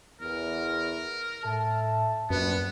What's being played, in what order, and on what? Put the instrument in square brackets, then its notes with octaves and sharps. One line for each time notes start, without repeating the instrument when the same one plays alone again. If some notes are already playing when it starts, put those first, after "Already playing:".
[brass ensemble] E2 [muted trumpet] A#4
[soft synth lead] A2 [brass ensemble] A4 E5 A5
[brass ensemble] A#1 [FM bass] F#2 [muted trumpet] B3 [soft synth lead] B4